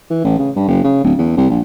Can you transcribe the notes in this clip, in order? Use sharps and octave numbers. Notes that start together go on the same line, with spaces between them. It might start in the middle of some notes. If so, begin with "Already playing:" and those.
E3
A1
C#3
G2
F#1
C#3
D1
E2
C2
A#1